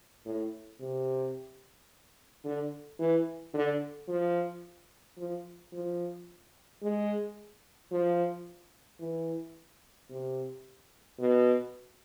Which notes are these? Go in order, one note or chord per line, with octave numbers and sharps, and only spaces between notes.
A2
C3
D3
E3
D3
F3
F3
F3
G#3
F3
E3
C3
B2